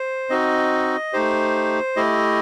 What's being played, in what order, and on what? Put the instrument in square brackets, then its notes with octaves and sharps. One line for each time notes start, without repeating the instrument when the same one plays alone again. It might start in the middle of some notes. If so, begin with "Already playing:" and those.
Already playing: [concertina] C5
C4 D#4 F#4 D#5
A3 D#4 G4 C5
A3 E4 G4 D#5